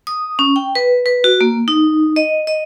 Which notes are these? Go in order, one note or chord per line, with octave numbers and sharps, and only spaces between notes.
D#6
C#4
G5
B4
B4
F#4
A#3
D#4
D#5
D#5